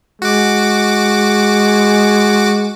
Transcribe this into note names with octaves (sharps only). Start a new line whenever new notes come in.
G#3 F#4 D6